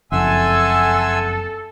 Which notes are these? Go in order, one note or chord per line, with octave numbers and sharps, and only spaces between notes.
F#1 F2 A4 E5 F#5 G#5 C6 E6